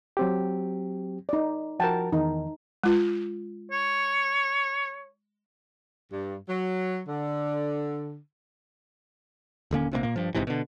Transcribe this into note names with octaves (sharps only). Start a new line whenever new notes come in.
F#3 C4 G4
D#4 D5
F3 F#4 A#4 F#5 G5 A5
E2 D#3 D#4
G#3 F4
C#5
G2
F#3
D3
D#1 D3 A#3 C#4
A#1 C3 G3 A#3
A#2 A#3
G2 F3
G#1 G#2 C3 E3
B2 D3